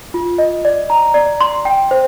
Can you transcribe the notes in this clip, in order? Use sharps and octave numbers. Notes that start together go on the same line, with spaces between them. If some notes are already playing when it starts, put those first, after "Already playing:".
F4
D#5
D5
A#5
D5
C6
G5
C5